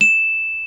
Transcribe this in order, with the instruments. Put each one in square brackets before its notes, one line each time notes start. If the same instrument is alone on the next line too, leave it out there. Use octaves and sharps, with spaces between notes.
[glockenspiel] E7